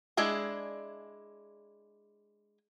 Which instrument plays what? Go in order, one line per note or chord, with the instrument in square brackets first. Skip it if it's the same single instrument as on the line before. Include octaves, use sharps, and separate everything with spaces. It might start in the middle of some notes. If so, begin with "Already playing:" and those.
[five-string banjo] G#3 D4 E4 G#4